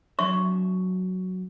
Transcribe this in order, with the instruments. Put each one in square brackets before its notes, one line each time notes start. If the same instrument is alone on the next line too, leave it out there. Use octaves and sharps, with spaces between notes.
[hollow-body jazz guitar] F#3 D4 E5 [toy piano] C#6